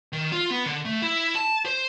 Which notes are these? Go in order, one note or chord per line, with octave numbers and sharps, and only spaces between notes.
D#3
F4
B3
D3
A3
E4
A5
C5